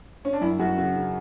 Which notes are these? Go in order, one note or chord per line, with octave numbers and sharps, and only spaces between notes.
C#4
D4
F#2 E4
F#2 F#4
C#3 F#4
C#3